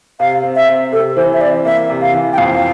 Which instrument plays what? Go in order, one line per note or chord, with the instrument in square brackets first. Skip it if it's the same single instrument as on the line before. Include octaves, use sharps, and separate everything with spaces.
[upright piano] C3 [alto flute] F5
[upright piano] C4
[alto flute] E5
[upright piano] C4
[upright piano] C3 [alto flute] A4
[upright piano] E3 [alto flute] C5
[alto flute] E5
[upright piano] C4 [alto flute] D5
[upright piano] A#3 [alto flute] E5
[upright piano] C3
[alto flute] F5
[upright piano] E3
[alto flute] G5
[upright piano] F2 [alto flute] F5